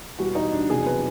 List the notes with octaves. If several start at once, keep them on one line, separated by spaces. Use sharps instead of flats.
E2 B2 G3 F#4
D#4
D4
F1 E2 B2 F#3 G#4
B4